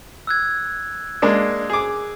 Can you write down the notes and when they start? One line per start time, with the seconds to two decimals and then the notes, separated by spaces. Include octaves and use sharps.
0.27 E6 F#6 G#6
1.22 G#3 A#3 D4
1.70 G#4 D6